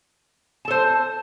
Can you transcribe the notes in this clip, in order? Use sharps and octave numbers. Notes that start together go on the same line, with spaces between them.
A4 C5 A5